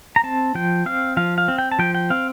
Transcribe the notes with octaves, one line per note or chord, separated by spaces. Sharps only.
A#5
C4 A5
F3 G5
C4 F5
F3 F5
F5
C4
G5
A5
F3 G5
G5
C4 F5